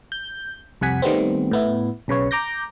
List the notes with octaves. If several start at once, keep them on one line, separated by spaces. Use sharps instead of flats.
G6
C2 F2 C3 F#5 G#5 B6
D#3 G3 A3 B3 C4
A2 B3 E4
B1 C#3 B4 C#5
A#5 D6 G6 A#6